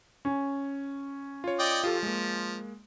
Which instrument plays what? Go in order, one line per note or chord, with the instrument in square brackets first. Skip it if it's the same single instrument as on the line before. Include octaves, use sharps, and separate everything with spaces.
[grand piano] C#4
[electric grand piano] F4 C#5
[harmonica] D5 D#5 G5
[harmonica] F3 [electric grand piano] F4 G4 A4
[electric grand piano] G#3 A#3